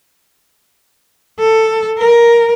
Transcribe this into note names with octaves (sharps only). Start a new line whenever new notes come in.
A4
A#4